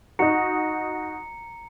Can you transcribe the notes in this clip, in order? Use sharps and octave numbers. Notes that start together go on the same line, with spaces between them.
D#4 F#4 A#5 C#7